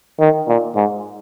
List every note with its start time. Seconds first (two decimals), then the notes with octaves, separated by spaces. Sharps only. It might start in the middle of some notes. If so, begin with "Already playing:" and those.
0.20 D#3
0.48 A#2
0.76 G#2